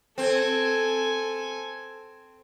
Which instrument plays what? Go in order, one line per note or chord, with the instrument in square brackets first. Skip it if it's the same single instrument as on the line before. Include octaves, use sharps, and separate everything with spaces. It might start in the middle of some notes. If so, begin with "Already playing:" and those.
[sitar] C4 [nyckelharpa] A4 G#5